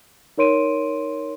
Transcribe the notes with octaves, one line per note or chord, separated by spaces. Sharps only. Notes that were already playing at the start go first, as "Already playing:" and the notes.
D#4 A#4 C#5 C6 D7 D#7